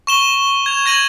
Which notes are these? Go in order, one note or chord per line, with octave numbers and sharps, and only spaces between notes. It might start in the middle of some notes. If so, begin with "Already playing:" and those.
C#6 E7 G7
G#6 F7
G#6 A#6 D#7 F#7